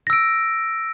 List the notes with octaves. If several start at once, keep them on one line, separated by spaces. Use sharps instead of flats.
E6 A#6 D7